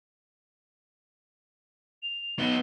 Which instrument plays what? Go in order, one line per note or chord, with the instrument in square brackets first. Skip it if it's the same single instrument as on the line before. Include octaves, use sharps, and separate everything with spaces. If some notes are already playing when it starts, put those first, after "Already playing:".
[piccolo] F7
[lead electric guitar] B3 D#4 [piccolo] G7